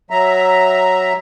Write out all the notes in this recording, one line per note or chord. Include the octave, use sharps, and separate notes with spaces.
F#3 E5 A#5